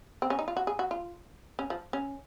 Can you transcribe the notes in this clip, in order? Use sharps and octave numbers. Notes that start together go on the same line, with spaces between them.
C4
C#4
D#4
F4
F#4
G#4
F#4
F4
C#4
F3
C#4